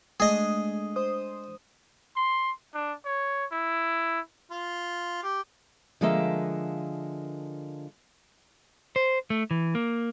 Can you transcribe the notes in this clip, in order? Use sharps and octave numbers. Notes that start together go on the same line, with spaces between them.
G#3 A3 D4 G#4 D#5
C5 D#6
C6
D4
C#5
E4
F4
G4
D3 F3 G#3 A#3 E5
C5
A3
E3
A#3